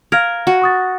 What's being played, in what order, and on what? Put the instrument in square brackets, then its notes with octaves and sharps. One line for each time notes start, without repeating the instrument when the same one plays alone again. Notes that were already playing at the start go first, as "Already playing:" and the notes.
[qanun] A#4 [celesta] F5 F6 G#6
[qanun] F#4
[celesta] C#6 D#6 A6